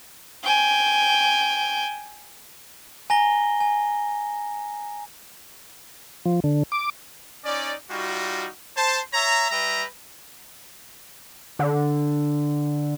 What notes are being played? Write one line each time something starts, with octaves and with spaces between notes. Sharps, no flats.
G5 G#5
G#5 A#5 A#6 G7
G#5
F3
D3
D6
C#4 D#4 D5
G3 D#4 F4 F#4
C5 A5
C#5 E5 A#5
G3 B4 E5 G5 A#5
D3